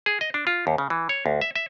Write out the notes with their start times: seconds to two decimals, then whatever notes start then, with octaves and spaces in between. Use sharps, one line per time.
0.06 G#4
0.21 D#5
0.34 D4
0.47 F4
0.67 D#2
0.78 C#3
0.90 E3
1.09 C#5
1.26 D2
1.41 E5
1.55 E5